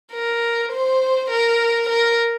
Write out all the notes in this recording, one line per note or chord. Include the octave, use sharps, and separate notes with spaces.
A#4
C5
A#4
A#4